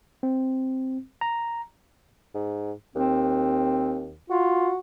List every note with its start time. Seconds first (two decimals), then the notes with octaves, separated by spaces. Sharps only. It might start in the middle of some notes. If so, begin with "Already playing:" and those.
0.23 C4
1.21 A#5
2.35 G#2
2.96 D#2 C4
4.30 F4 F#4